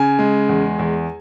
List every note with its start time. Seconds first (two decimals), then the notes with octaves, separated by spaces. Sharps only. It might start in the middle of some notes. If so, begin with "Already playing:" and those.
Already playing: C#3 G#5
0.19 G#3
0.49 E2
0.79 E2